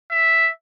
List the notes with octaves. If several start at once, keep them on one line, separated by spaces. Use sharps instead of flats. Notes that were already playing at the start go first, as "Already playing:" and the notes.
E5